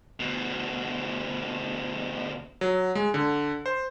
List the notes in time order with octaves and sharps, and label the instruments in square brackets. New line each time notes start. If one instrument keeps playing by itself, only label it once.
[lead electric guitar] D2 B2
[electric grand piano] F#3
G#3
D3
C5